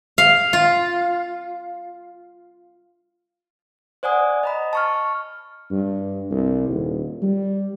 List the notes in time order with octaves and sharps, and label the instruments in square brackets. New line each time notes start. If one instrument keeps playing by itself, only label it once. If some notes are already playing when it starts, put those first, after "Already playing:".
[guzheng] F5
F4
[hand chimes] C5 D5 F#5 G#5 D#6
D#5 A#5 B5
A5 C#6 F6
[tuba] G2
C2
D#1
G3